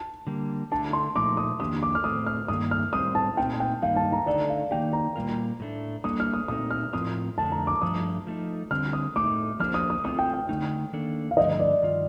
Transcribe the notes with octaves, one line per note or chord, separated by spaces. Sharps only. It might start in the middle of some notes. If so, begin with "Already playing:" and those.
Already playing: A5
D3 G3 A#3
D3 A3 D4 A5
C6
A#2 F3 A3 D#4 D6
D#6
F2 D#3 A#3 D4 G4 D#6
D6
F6
A2 A3 C4 D#6
F6
G2 D#3 A#3 D#6
F6
A2 G3 C4 G4 C5 D#6
A5
A#2 A3 C4 D#4 G5
G5
G2 D#3 G3 A#3 D#4 F5
A5
A#5
D3 A3 D#4 A4 D5
F5
D#3 A#3 D#4 G4 G5
A#5
A#2 G3 A#3 F4 A#4
A2 A3 D4
G3 A#3 D4 A4 D#6
F6
D#6
A#2 A3 C4 D#4 D#6
F6
A2 F3 C4 F4 A#4 D#6
F2 D3 A3 D4 A5
A#5
D6
G2 F3 A3 D4 D#6
F3 A3 D#4
D3 G3 C4 F6
D#6
A2 A3 D#4 D6
F3 A#3 D4 G4 C5 F6
D#6
D#6
A3 C4 F4 D#6
G5
G5
D3 A3 D#4
D#3 A#3 D4 A4 D5
F5
G2 D3 F3 A3 D#5
D5
G2 D#3 F4